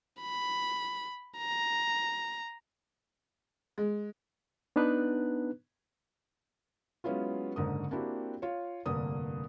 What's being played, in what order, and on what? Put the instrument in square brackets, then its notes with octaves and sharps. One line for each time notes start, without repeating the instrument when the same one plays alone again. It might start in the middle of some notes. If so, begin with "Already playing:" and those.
[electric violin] B5
A#5
[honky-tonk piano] G#3
[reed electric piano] B3 D4 D#4 B4 F#6
[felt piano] F#3 G#3 B3 C#4 E4 F4
F#1 G#2 D3 A#4 D#6
A#3 C4 D4 E4 F#4 G4
F4 C#5
F1 G2 D3 A#3 D#6